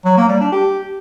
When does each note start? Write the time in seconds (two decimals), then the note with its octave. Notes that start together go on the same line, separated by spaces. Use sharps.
0.05 F#3
0.17 A#3
0.29 G3
0.40 D4
0.52 G4